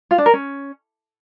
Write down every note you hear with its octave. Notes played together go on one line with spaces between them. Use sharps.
F4
D4
A#4
C#4